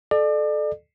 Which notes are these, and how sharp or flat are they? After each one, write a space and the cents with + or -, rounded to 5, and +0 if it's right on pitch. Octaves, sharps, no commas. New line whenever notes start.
A4 -20 D5 +35